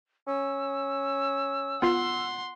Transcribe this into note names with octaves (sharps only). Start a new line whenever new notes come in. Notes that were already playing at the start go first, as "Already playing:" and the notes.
C#4 E6
B3 F4 F#5 C6 C7